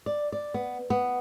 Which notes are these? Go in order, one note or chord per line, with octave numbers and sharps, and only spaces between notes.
D5
D5
B3
B3